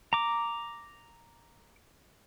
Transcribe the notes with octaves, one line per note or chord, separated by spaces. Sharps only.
A#5 D6